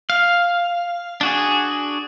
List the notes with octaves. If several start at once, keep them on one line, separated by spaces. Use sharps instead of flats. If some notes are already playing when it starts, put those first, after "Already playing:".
F5
D4 F#4 G#4